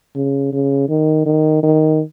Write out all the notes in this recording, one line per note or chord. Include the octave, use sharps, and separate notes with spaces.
C#3
C#3
D#3
D#3
D#3